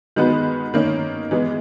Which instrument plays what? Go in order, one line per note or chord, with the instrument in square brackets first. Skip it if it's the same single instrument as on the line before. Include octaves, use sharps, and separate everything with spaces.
[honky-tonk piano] D#3 G#3 B3 F#4 B4
D#3 A#3 C#4
E3 G#3 B3